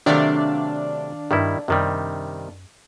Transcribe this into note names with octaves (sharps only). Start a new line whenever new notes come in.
C3 D#3 F#3 A3 D4 D5 F5
G2 D#3 G3 E4
F#2 C3 D#3 G3